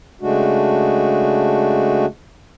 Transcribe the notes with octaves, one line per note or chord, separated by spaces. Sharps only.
C#3 G#3 A3 D4 F#4